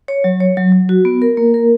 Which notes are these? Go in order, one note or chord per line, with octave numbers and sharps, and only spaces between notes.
C#5
F#3
C#5
F#3
F#3
F#4
B3
A#4
A#3
A#4